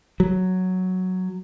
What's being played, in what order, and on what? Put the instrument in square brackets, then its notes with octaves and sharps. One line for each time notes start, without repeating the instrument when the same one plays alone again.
[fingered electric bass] F#3